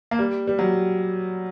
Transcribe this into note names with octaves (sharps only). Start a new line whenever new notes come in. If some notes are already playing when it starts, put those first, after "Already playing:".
A#3
G3
G3
F#3